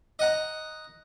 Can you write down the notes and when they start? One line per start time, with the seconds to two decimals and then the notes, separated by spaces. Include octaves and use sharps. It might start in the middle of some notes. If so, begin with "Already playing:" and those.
0.19 D#5 F#5 A#5